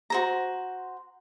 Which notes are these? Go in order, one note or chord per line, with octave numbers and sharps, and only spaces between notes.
F#4 C5 A#5